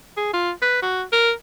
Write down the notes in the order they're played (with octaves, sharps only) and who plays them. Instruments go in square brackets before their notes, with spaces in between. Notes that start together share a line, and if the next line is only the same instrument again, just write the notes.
[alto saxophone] G#4
F4
B4
F#4
A#4